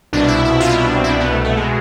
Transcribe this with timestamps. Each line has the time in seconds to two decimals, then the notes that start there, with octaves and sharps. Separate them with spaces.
0.13 C2 B2 D4
0.28 E4
0.45 E4
0.60 C2 B2 F4
0.72 E4
0.85 D4
0.96 C4
1.04 E4
1.09 C2 B2 D4
1.20 B3
1.32 A3
1.44 A3
1.57 B2 G#3